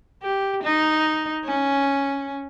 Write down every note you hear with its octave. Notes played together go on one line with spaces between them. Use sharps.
G4
D#4
C#4